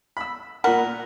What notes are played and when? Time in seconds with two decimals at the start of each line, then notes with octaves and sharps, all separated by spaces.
0.17 B5 E6
0.64 A#2 A#4 F#5 B5